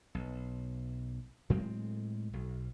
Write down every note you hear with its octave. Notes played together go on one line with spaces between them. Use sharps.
B1
A2 F#3 G#3 C4
B1